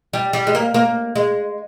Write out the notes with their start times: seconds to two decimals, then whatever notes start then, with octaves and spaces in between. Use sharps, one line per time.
0.13 G3
0.33 G3
0.47 G#3
0.55 A#3
0.74 A#3
1.15 G#3